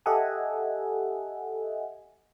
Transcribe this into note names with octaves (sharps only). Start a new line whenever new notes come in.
G4 A4 D#5 E5 F#5 G#5